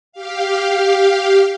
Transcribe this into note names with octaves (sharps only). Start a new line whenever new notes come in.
G4 F5